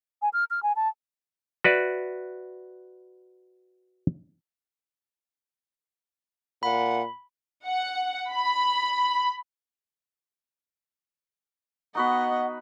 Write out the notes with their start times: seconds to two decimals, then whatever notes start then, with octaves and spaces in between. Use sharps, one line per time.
0.22 G#5
0.33 F6
0.50 F6
0.63 G#5
0.76 A5
1.64 F#4 B4 D5 E5
6.63 A#2 F#5 B5
7.67 F#5
8.31 B5
11.95 B3 D#4 F#4 D#5 F#5 B5